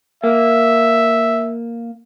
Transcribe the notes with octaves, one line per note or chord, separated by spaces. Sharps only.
A#3 E5